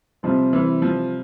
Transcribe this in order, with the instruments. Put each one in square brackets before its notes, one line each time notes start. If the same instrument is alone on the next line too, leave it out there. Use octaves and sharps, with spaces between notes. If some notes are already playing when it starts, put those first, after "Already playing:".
[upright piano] C3 G3 C4 [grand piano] F3
[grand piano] E3
F3